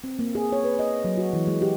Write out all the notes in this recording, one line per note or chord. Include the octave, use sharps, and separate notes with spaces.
C4
A#3
G#4
C#5
B4
D#5
F#3
F#4
E3
G#3
G4